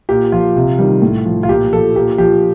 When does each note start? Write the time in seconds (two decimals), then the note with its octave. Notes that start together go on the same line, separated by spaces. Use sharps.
0.09 A#2 G4
0.32 F3 F4
0.56 C3
0.79 D#3 G3
1.02 A2
1.25 F3
1.43 F4
1.49 A#2 G4
1.73 F3 A4
1.96 A#2 G4
2.18 F3 G4